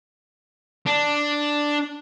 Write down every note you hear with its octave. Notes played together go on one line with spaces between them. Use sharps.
D4